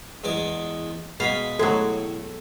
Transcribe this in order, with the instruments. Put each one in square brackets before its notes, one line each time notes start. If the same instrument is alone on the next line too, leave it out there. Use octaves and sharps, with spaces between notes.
[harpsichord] E2 G#3 D5
[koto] B2 F5 [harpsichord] G#3 B5
[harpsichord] A2 [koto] F#3 G#3 [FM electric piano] A4